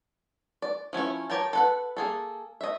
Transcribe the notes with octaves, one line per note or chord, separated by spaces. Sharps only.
D5
F3 C#4 E4 C#5
G4 A#4 C#5 G5 A5
A4 B4 F#5
A#3 G#4 A4
D#5 E5